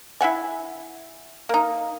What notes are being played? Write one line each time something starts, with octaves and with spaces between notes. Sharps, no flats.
E4 E5 F#5 G#5
A#3 D#4